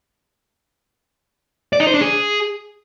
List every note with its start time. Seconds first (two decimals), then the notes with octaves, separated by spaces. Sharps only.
1.73 D5
1.80 D#4
1.87 C5
1.94 D4
2.01 G#4